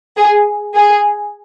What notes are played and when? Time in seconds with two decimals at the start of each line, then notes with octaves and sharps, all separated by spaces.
0.17 G#4
0.75 G#4